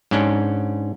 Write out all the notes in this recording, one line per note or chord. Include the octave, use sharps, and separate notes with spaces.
G#2 C#4 D4